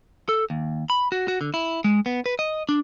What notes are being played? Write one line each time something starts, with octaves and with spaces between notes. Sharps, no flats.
A4
D#2
B5
F#4
F#4
D3
E4
G#3
B3
B4
D#5
D4